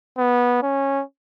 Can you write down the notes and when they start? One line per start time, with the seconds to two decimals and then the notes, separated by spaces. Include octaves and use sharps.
0.18 B3
0.63 C#4